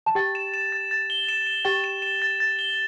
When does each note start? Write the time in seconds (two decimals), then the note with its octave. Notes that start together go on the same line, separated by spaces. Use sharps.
0.06 A5
0.15 G4 G5 A6
0.35 E7
0.54 E7
0.72 A6
0.91 A6
1.10 G7
1.29 E7
1.47 E7
1.65 G4 G5 A6
1.84 E7
2.02 E7
2.22 A6
2.40 A6
2.59 G7